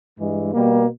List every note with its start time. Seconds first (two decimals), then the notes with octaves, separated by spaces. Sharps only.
0.18 G2 E3 G#3
0.53 B2 G3 A#3